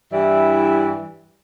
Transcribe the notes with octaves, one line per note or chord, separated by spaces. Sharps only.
G2 E3 G3 E4 D5 E5